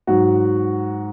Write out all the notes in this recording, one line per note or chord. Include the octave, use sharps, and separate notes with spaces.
G#2 F#3 F#4